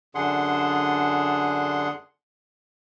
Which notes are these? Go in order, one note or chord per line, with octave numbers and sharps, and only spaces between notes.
F#2 D3 D4 G#4 F#5 C6